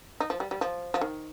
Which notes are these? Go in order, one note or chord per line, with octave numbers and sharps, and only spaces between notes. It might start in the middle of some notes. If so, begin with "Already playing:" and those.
D#4
F3
G3
G3
F3
F3
D#3